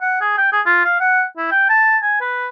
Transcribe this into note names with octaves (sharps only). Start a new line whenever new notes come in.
F#5
G#4
G5
G#4
F4
F5
F#5
E4
G5
A5
G#5
B4